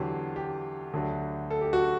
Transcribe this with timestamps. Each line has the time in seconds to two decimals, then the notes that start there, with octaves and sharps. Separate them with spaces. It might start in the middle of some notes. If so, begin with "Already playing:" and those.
Already playing: E2 D3 F#3 G4
0.36 G4
0.93 D2 D3 F#3
1.50 A4
1.61 G4
1.73 F#4